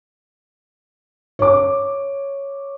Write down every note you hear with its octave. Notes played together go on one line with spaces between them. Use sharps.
C#5 D6